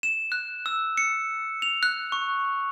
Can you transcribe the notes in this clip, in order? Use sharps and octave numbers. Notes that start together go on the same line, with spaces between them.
E7
F#6
E6
C#7
F7
F#6
C#6